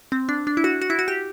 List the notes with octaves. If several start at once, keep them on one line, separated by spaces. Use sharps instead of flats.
C4
D4
D4
E4
F#4
F#4
E4
F#4
G4